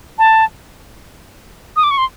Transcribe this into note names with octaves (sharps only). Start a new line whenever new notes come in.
A5
D#6
D6
C#6
C6